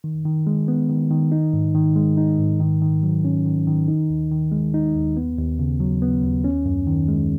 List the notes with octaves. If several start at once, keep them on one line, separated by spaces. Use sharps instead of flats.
D#3
D#3
G#3
B3
D#3
D#3
D#4
G#2
D#3
G#3
D#4
G#2
D#3
D#3
F#3
C#4
D#3
D#3
D#4
D#2
D#3
G#3
D#4
D#2
B3
D#2
C#3
F#3
B3
D#2
C#4
F#2
D#3
G#3